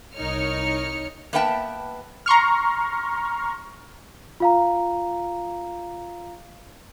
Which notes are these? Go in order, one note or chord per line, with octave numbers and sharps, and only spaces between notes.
C2 D#4 A#4 C#5 F6 C#7
A#3 B3 B4 E5 G5 A5
A#5 C6 C#6 F6
F4 F5 A#5